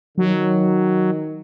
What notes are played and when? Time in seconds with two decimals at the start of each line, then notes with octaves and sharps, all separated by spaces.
0.18 D#3 F#3